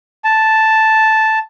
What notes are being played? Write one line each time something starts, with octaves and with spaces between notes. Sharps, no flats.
A5